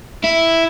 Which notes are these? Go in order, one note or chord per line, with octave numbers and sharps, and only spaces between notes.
E4